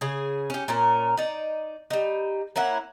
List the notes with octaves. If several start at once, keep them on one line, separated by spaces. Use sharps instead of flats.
C#3 G#4
C#4 G4
A#2 C#4 A#4
D#4 D5
G3 D#4
A#3 C#4 E4 F#5